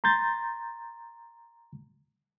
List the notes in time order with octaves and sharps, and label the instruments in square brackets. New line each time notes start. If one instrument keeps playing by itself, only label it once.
[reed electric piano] A#5 C6 G6 A6